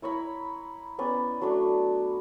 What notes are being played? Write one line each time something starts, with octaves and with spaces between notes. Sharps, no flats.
E4 C#5 A#5 B5
B3 C#4 D5
F#3 A3 D4 F#4